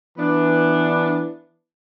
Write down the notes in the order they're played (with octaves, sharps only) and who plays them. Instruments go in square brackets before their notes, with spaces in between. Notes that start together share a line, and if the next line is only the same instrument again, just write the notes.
[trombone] E3 [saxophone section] B3 D4